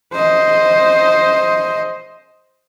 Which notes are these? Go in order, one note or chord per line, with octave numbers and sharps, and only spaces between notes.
C5 D#5